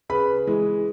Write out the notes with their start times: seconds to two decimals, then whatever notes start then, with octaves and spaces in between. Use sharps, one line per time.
0.09 C#3 B4 B5
0.47 E3 G#3